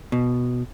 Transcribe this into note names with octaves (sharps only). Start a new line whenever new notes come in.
B2